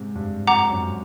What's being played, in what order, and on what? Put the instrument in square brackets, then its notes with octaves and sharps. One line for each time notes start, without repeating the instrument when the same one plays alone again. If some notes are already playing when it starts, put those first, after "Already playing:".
Already playing: [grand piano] G#2 C3
G2
[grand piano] F2 [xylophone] F#5 A#5 D6
[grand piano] F#2